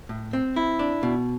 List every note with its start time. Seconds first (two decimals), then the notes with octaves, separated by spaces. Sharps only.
0.09 A2
0.33 C4
0.56 E4
0.79 D4
1.03 B2